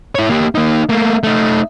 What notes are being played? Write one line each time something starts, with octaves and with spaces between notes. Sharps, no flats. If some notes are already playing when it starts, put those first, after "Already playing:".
E4 C#5
A#3 G4
A#3 D#4
A3 A#3
A3 D#4